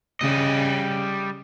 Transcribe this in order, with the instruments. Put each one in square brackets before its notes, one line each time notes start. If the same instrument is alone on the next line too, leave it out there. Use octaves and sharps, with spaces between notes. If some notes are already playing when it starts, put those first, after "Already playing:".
[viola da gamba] C#3 [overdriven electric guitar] G3 D#5